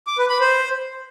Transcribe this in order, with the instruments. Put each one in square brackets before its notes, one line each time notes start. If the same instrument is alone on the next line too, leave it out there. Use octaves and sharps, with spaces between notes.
[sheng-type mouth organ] D6
B4
B5
C5